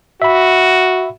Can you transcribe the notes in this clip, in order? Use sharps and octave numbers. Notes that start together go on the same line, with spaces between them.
F#4 E5 B5